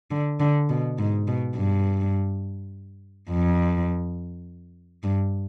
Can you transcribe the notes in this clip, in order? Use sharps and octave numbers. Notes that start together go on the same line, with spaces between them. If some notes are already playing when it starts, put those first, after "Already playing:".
D3
D3
B2
G#2
B2
G2
F2
G2